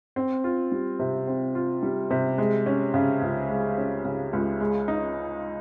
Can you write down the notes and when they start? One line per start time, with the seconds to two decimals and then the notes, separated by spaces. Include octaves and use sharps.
0.16 C4
0.44 F4
0.72 G3
0.99 C3
1.27 C4
1.55 F4
1.83 G3
2.11 C3
2.38 G#3
2.66 C#4
2.94 C#3
3.22 C#2
3.50 G#3
3.78 C#4
4.05 C#3
4.33 C#2
4.60 G#3
4.88 D#4